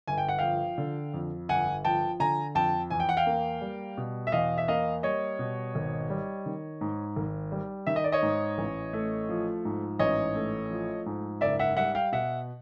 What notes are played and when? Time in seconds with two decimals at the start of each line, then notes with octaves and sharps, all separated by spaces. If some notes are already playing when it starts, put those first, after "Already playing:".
0.07 G1 G#5
0.18 G5
0.29 F#5
0.39 F3 F5 G5
0.78 D3
1.14 F2
1.49 G1 F#5 G#5
1.85 F3 G5 A5
2.20 D3 G#5 A#5
2.55 F2 G5 A5
2.90 E2 G#5
3.00 G5
3.09 F#5
3.17 F5 G5
3.26 A#3
3.61 G3
3.97 B2
4.27 E5
4.32 E2 D#5 F5
4.58 E5
4.68 A#3 D#5 F5
5.03 G3 C#5 D#5
5.39 B2
5.75 G#1
6.10 G3
6.46 D#3
6.81 G#2
7.16 G#1
7.52 G3
7.87 D#3 E5
7.96 D#5
8.04 D5
8.12 C#5 D#5
8.22 G#2
8.58 A1
8.93 A3
9.29 F3
9.65 G#2
9.99 A1 C#5 D#5
10.35 A3
10.71 F3
11.06 G#2
11.41 F#1 D5 E5
11.59 E5 F#5
11.77 G3 E5 F#5
11.95 F5 G5
12.12 B2 E5 F#5